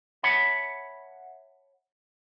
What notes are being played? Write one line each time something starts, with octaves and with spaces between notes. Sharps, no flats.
C#5 E5 F#5 A5 B5